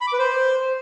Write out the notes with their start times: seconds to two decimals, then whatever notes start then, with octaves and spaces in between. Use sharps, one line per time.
0.01 B5
0.07 D6
0.13 B4
0.19 C5